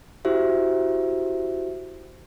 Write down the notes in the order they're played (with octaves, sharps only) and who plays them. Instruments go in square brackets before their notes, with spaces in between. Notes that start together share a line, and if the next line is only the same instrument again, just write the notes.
[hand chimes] E4 F#4 G4 C5 E5